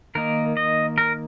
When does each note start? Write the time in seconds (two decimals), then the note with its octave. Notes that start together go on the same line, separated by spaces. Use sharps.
0.15 D#3 A#3 D#4 A#4
0.57 D#5
0.98 A#4